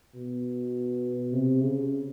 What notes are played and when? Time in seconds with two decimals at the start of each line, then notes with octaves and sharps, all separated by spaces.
0.15 B2
1.33 C3
1.62 C#3